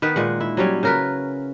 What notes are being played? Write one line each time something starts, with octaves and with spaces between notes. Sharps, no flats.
D#3 B3 B4
A#2 G#3 F#5
E4
F#3 G3 C#4
C#3 A#4 B4